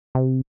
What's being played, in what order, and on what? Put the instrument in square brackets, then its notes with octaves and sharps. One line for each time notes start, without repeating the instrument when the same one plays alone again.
[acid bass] C3